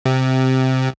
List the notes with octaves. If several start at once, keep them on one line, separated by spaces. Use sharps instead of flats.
C3